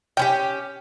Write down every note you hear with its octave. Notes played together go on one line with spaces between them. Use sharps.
C#4 E4 G4 G5